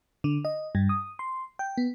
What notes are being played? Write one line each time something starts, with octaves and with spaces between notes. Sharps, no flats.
D3
D#5
G2
D#6
C6
G5
B3